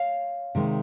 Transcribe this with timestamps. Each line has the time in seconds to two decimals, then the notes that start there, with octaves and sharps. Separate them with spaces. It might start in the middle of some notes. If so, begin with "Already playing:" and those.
Already playing: C#5 F5
0.55 C3 D#3 G#3